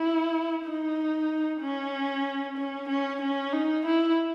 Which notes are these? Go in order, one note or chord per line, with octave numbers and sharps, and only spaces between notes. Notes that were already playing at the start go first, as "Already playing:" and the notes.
Already playing: E4
D#4
C#4
C#4
C#4
C#4
D#4
E4